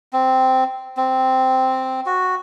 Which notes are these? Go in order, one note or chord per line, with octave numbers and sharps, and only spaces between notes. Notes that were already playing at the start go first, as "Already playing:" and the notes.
C4
C4
F#4